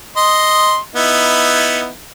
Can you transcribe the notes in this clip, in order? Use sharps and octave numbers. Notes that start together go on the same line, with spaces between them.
D#5 C6
B3 D#4 E4